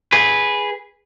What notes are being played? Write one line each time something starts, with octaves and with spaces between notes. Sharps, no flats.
G#4 B4